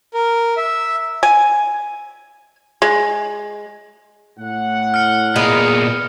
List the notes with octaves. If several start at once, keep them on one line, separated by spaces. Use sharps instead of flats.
A#4
E5
G#5
G#3
A2 F#5
F6 C#7
A#2 G#3 B3 A#4 B4